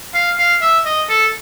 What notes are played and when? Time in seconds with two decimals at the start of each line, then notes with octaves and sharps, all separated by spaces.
0.14 F5
0.38 F5
0.62 E5
0.85 D#5
1.09 A4